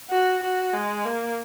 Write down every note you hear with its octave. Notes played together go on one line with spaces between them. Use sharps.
F#4
F#4
G#3
A#3